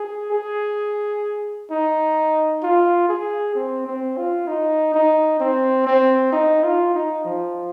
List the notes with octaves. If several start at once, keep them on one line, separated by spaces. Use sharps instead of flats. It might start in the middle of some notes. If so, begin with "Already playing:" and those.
Already playing: G#4
G#4
D#4
F4
G#4
C4
C4
F4
D#4
D#4
C4
C4
D#4
F4
D#4
F3